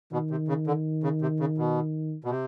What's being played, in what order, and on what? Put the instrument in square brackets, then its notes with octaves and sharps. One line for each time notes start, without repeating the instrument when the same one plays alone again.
[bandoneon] B2 [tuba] D#3
[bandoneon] C3
C#3
D3
C#3
C3
C#3
B2
B2
C3